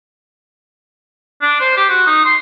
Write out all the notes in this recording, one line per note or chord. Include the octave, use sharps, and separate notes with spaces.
D4
C5
G4
F#4
D#4
C6